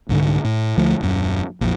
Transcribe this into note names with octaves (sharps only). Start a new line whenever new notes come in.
C2 G#2 D3
A2
D2 D3 F3 A3
D#1 F#2
A#1 F2